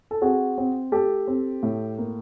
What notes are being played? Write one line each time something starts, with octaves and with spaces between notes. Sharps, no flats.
A4
C4 F#4 G#4
C4
A3 G4 A4
C4
A2
A#3